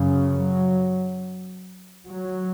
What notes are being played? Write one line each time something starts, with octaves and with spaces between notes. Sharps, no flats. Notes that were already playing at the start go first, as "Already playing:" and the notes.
Already playing: F#2 C#3
F#3
F#3